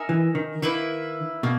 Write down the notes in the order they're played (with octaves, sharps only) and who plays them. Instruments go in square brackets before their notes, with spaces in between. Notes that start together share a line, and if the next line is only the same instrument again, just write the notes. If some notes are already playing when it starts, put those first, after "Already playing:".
Already playing: [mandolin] D#4 A#4 E5 G#5
[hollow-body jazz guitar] E3
D#3
[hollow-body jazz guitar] D#3 [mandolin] A#3 E4 B4 E5
[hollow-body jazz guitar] B2 [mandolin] A#3